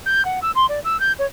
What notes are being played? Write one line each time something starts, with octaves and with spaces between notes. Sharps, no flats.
G6
F#5
E6
C6
D5
E6
G6
C#5